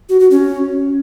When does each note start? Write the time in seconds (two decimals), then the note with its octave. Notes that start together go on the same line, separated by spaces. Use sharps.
0.09 F#4
0.20 F#4
0.31 C#4